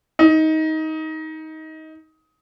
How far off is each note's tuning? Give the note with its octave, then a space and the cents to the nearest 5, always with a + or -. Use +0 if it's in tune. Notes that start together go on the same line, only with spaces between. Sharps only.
D#4 +20